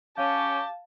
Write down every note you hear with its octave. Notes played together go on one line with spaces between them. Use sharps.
C#4 G4 F5 A5